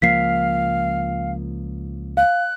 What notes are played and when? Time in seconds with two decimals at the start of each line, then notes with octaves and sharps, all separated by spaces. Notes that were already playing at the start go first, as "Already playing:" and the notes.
0.02 C#2 F3 A#3 F5 B6 C7
2.17 F5 F#6